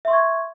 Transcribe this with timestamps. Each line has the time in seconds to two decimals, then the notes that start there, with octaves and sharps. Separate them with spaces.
0.05 E5
0.08 C6
0.10 C#6
0.13 G#6